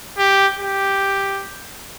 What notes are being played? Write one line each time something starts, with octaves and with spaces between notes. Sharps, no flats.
G4
G4